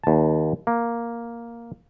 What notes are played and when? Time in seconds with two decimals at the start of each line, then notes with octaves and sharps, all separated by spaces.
0.04 D#2 A5
0.67 A#3